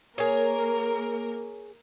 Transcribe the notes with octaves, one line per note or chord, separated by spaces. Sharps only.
A#3 G#4 A#4 C#5